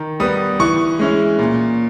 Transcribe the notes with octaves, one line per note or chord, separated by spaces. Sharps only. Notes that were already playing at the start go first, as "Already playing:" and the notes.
Already playing: D#3
G3 B3 D#6
E3 C#6
G#3 C#4 E4
A#2